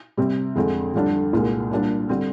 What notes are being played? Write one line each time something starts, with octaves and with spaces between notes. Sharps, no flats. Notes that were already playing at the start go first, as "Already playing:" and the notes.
C3 G3 C4
F2 D3 G#3 C4
F2 D3 G3 D4
C2 A#2 G#3
A#2 G3 D4
D3 G3 C4